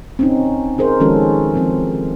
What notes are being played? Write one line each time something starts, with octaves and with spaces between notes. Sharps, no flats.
C4 C#4 D#4
D#4 G#4 A#4 C5
D#3 F3 G#3 C#4 F#4 A4
E3 F3 C4